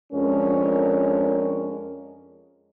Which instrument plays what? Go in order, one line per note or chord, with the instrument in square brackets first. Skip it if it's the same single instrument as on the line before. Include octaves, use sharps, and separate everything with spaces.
[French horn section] F2 G#3 C#4 D4 A#4